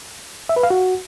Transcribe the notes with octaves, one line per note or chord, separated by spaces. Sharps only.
E5
B4
F5
F#4